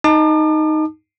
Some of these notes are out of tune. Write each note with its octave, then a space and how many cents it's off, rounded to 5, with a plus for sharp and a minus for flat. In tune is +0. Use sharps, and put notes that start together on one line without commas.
D#4 +0 A5 +0 D6 +40